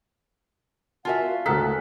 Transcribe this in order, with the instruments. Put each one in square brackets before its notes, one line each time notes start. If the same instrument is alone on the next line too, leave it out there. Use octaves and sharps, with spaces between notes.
[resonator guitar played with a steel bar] F4 F#4 E5 [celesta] A#4 G#5 A5 [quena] F#5
[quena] F5
[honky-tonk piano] D2 F#6 B6 [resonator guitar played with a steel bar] A4 [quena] A#4 [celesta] A#5 D#6 F6